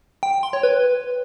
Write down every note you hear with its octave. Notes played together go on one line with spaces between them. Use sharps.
G5
G5
C6
C#5
B4